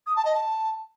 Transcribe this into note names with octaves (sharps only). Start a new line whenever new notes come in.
D#6
A5
D#5
A5